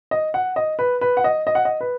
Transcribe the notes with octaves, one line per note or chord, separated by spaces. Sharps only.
D#5
F#5
D#5
B4
B4
F#5
D#5
D#5
F#5
D#5
B4